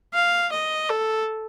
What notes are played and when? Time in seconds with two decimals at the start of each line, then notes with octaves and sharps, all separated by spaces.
0.14 F5
0.52 D#5
0.89 A4